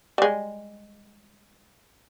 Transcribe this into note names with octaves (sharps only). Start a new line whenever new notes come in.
G3 G#3